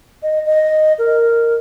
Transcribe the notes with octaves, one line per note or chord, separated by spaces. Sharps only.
D#5
D#5
A#4